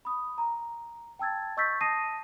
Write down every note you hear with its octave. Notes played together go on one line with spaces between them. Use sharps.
B5 D#6
A#5
G5 A5 E6 G#6 A6
D#5 C#6 E6 G6 A6 B6
A5 D#6 A#6 C7 D#7